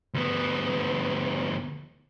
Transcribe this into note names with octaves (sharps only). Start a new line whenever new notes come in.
D2 B3